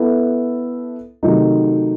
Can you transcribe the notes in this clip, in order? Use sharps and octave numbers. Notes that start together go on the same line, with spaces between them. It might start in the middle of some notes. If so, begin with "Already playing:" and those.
Already playing: B3 E4 A4
C3 D#3 F#3 A3 D#4